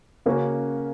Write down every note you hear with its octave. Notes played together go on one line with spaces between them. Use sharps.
C#3 A#3 C#4 F#4